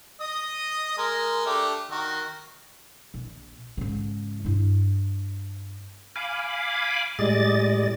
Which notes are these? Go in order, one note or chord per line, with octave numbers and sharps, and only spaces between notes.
D#5 D#6
G#3 A#4
A3 D4 G4
D#3 F#4
A#1
G#2 C#3
G2 E4
F5 G#5 B5 D6
A2 G3 G#3 D5 D#5 A6